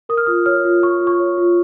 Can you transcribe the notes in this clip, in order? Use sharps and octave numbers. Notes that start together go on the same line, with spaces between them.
A#4 D#6
F6
F4 D#6
C#5 F6
F4
A#4 C#6
F4
C#6
C#5
F4